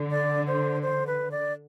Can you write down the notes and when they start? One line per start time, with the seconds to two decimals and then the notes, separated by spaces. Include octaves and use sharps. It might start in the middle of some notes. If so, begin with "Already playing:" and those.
Already playing: D3
0.10 D5
0.47 C5
0.82 C5
1.07 B4
1.31 D5